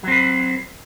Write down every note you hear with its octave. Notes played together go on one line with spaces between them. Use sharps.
F#3 C4 B4